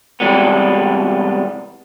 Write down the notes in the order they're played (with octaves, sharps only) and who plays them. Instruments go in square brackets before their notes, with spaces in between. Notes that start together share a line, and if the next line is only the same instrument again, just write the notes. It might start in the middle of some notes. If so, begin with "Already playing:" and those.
[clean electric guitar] C3 E3 G3 G#3 B3